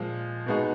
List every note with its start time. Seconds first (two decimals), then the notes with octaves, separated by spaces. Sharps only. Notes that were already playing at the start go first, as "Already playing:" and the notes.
Already playing: A#2 F3 G#3
0.46 B2 G#3 B3 D#4 F#4